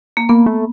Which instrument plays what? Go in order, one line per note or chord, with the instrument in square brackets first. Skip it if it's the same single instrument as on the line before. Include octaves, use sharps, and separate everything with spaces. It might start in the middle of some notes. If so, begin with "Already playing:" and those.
[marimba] A#3
[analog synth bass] A#3 [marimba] B3
[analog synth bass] A3